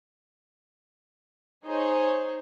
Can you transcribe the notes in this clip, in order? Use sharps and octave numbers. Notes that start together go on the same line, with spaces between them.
D#4 G#4 C5 C#5